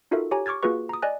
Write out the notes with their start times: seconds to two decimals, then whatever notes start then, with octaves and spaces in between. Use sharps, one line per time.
0.11 D#4 F4 F#4 A4 A#4 E5
0.31 G4 C#5 G#5 A#5
0.46 C#6 D6 F6 G#6 A6
0.63 A#3 F4 F#4 G#4 B4 C#6
0.89 A#5 D#6
1.02 D5 D#5 G#5 F#6